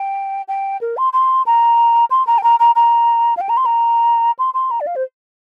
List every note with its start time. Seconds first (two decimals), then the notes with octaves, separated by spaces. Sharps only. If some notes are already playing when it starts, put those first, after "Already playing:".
Already playing: G5
0.48 G5
0.81 A#4
0.97 C6
1.13 C6
1.46 A#5
2.10 C6
2.27 A#5
2.38 G5
2.43 A#5
2.60 A#5
2.75 A#5
3.37 F5
3.41 G5
3.49 A#5
3.57 C6
3.66 A#5
4.39 C6
4.54 C6
4.71 A#5
4.80 D5
4.87 F5
4.96 C5